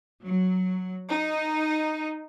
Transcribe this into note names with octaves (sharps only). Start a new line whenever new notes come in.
F#3
D#4